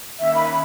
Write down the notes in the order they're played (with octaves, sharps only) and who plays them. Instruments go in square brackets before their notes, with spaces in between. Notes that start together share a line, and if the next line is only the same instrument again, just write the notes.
[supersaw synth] D#3 A#3 C#4 [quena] E5
[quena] B5